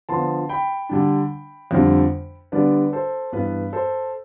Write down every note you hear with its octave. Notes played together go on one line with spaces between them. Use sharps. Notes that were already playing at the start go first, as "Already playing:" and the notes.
D3 F3 B3 D4 A5 C6
G5 B5
D3 G3 D4
F2 D3 G3 D4
D3 G3 B3 D4 B4 D5
A4 C5
G2 E3 B3 B4
A4 C5